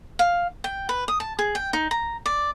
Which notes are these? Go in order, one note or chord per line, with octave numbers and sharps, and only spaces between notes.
F5
G5
B4
D#6
A5
G#4
G5
D#4
A#5
D5